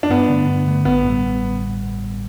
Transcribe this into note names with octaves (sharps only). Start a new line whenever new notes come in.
D4
G2 B3
D3 A3
G2
D3 A3
A1 B3
A2 G3